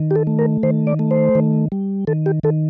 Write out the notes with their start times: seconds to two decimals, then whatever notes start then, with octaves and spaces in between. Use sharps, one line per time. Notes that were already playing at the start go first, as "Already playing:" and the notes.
Already playing: D#3
0.11 G4
0.16 A4
0.27 A3
0.39 A#4
0.63 D#3 C5
0.87 D5
0.99 A3
1.11 C5
1.35 D#3
1.72 G3
2.07 D#3 A4
2.26 G4
2.43 D#3 A4